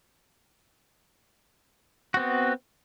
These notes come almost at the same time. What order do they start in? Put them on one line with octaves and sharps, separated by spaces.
F#4 C4 B3